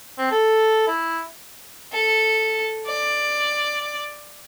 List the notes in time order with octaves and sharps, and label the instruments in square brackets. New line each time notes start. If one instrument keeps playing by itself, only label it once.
[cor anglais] C4
A4
E4
[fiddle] A4
D5